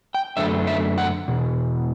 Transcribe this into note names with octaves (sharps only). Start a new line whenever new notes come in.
G5
F#2 D3 A3 E5
E5
F#5
E2 B2